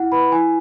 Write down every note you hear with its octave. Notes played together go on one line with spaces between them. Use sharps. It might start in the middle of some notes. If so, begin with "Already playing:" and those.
Already playing: E4 F#5
B4 B5
E4 G#5